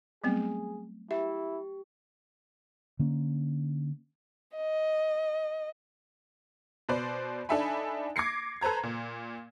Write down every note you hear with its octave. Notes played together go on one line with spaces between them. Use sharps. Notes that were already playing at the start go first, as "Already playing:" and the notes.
F#3 G3 A3 B3 C4 G#4
E4 G4 E5
D3 A#3 C#4
D#5
B2 B4 C5 D5
D4 D#4 A4 E5 G#5 B5
D6 G#6 A#6 C7 C#7
A4 B4 C5 A#5 G#6
A#2